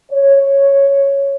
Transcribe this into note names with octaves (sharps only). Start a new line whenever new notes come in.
C#5